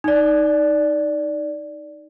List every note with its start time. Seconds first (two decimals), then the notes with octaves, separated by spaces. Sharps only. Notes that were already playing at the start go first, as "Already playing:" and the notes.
0.04 D#4 D5